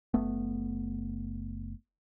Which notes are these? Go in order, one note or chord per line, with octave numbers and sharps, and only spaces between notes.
F#1 A3 B3